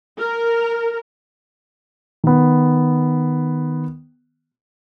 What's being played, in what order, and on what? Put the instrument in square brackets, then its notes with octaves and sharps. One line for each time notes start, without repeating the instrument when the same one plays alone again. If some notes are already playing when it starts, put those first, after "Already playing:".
[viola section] A#4
[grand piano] D#3 B3